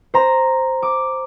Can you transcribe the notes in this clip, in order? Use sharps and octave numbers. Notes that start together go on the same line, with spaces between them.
C5 A#5
D6